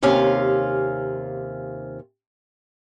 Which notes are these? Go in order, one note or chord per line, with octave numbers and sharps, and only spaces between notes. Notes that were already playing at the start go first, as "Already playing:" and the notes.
D#2 C3 C#4 F4 F5